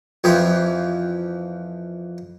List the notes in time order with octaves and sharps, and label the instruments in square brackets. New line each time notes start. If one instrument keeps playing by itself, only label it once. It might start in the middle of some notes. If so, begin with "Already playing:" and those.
[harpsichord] F2 E3 F3 G4